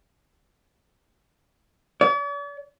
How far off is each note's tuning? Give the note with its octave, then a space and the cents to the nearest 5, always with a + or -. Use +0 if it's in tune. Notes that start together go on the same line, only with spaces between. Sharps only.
D5 -45